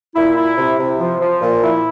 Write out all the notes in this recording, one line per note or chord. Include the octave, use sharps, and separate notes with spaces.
A#2 E4
E4
C3
C3
F3
F3
A#2
E4